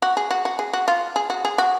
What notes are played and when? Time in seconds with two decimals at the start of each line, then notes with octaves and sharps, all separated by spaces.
0.02 F#4
0.17 G#4
0.31 F#4
0.45 F#4
0.59 G#4
0.73 F#4
0.88 F4
1.16 G#4
1.30 F#4
1.45 G#4
1.58 F#4